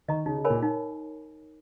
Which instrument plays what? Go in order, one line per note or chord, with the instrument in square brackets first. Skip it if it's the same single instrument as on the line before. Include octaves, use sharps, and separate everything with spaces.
[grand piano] D#3 [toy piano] D#5 A#5 C#6
[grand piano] C#3 [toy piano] D#4
[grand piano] C#3
[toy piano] A#4 C#5 G#5 B5
[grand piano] A#2
[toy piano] D#4